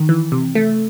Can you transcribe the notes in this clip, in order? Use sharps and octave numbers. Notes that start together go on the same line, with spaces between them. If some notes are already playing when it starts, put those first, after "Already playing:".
Already playing: D#3
E3
C3
A3